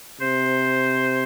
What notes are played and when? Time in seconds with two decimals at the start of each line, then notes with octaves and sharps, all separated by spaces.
0.21 C3 C5